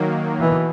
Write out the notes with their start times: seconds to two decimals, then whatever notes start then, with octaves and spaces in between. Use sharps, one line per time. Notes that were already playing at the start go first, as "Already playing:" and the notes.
Already playing: D#3 F#3 A#3
0.40 B2 E3